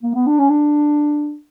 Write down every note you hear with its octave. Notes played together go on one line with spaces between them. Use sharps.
A#3
B3
D4
C#4
D4